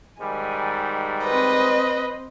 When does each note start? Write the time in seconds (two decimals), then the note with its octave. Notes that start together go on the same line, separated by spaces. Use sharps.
0.20 G#2 D#3 G3 G#5
1.24 C4 B4 C5 D#5